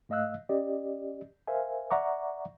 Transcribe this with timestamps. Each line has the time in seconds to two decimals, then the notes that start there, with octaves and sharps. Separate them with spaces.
0.09 G#2 A3 D#5 F5 E6 F#6
0.49 C#4 G4 D5 D#5
1.47 A#4 C5 E5 F5 G#5
1.90 D5 E5 F#5 A#5 C#6 D6